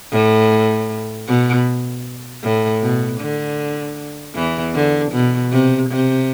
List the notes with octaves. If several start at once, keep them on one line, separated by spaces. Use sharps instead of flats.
A2
B2
A2
B2
D3
E2 E3
D3
B2
C3
C3